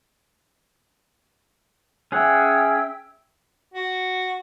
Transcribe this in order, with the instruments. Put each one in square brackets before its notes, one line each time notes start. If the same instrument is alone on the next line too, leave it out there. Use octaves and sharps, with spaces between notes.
[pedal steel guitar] C#4 G#4 F#5 [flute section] E5 G5 E6
[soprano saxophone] F#4